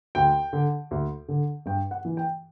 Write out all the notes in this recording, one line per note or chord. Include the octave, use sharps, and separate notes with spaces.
D2 G5
D3
D2
D3
G2 G5
F#5
E3
G5